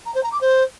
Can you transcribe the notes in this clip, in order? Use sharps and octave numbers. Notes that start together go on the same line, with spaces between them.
A#5
C5
A#5
D6
C5